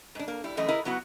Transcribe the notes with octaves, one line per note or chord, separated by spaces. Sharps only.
G#2 D4
A#3
G3 E4
F#2 E3 A3 D#5
E4 G#4 A#4 D#5
F#3 B3 E4 F#4